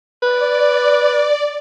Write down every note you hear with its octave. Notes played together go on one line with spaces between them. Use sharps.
B4 D5